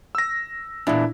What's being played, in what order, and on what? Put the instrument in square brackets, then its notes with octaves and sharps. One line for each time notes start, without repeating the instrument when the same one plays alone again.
[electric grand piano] E6 A#6
[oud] E2 A#2 [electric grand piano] D4 E4